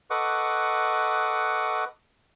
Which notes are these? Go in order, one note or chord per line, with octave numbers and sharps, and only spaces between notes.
A4 B4 D#5 F#5 C#6 D6